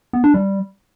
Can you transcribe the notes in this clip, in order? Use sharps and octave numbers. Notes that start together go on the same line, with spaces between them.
B3
D4
G3